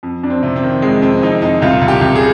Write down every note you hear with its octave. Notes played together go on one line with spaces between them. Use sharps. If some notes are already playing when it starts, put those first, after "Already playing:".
F2
F2 D4
C4
C3
C4
D#3
F2 G#3
F2 C4
F2 D#4
F2 D#4
C2 F4
C2
G4
C2
G#4